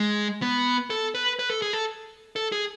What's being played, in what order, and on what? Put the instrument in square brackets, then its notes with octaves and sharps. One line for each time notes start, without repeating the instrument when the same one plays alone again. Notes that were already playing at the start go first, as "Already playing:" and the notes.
Already playing: [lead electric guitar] G#3
B3
A4
B4
B4
A4
G#4
A4
A4
G#4